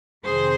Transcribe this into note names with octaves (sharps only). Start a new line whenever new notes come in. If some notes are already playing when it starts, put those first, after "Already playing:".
F2 C3 D#3 G#4 C5